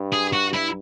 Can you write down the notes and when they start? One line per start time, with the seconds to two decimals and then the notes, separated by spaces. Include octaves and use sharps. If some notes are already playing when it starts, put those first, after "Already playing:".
Already playing: G2
0.12 G#4
0.33 F#4
0.53 E4